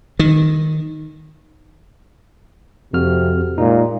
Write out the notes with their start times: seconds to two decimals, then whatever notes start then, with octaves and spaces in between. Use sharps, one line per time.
0.19 D#3
2.93 F2 C3 F#4 F6
3.58 A#2 G#3 D#4